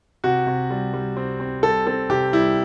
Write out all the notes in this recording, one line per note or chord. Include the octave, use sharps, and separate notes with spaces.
C3 F#4
C3
G3
G3
C4
C4
G3 A4
C4 A4
C3 G4
G3 E4